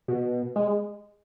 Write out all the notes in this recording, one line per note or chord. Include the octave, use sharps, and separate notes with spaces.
B2
G#3